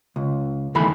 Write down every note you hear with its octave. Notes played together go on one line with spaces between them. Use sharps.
C#2
E2 D#3 E3 A3 B5